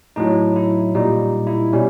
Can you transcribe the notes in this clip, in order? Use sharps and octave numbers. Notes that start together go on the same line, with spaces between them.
A2 F#3 D#4
E4
A#2 G3 D#4
E4
B2 G3 C#4